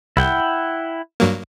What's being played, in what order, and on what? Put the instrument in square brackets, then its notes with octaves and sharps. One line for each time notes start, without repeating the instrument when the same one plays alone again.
[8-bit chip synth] C2 [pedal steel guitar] E4 F#5 G5
[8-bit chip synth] G2 F#3 A#3